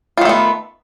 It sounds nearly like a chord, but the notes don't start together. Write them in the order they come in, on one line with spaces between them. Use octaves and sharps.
F4 D#3 A3 B3